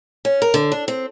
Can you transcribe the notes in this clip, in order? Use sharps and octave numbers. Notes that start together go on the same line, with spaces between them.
C#4
A#4
D3
D4
C4